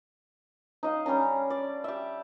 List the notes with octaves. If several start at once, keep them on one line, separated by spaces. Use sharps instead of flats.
D#4 D#5 F5
G3 C#4 D4 A#5
D5
G4 E5